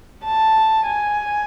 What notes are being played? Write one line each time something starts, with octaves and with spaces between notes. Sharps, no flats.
A5
G#5